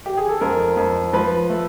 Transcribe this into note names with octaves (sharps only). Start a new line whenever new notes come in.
G4
G#4
A4
F2 A#4
F2
F3 B4
A3